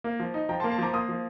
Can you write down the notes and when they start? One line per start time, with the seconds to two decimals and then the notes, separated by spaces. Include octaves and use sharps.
0.04 A#3
0.20 F3
0.34 D#4
0.49 F3 G5 A#5
0.60 A5 C6
0.64 A#3
0.71 A5 C6
0.78 F3 A#5 D6
0.93 A#3 C6 D#6
1.09 F3